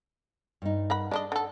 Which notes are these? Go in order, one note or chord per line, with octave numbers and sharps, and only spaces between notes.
G2 D#4
A#4 F#5 B5
G#3 D4 D5 D#5
D3 A4